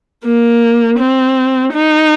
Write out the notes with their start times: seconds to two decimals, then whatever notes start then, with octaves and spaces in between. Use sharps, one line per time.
0.24 A#3
0.98 C4
1.72 D#4